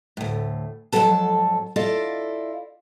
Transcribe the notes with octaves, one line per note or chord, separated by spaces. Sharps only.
D2 A2
F2 G#2 D#3 F#3 A4 A5
E4 F4 A4 D5 D#5 F5